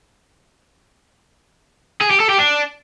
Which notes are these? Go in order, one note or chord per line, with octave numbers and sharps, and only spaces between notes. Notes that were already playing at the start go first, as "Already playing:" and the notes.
G#4
G4
A4
G4
D4